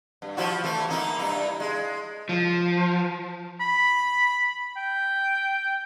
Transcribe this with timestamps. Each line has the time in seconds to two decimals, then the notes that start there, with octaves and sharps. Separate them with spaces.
0.22 G2
0.37 F3 E4 F#4
0.64 E3 A3
0.89 A#3 D#4 E4
1.18 G2 D#4 E4
1.60 G#3
2.29 F3
3.61 B5
4.77 G5